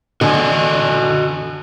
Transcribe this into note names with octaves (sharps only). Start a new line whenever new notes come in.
D3 F#4 D#5 G#5